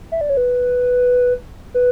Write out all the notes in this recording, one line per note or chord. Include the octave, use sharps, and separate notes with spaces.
E5
D5
C#5
B4
B4